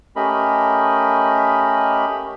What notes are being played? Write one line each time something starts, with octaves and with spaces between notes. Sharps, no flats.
A3 C#4 G4 A#4 D#5 B5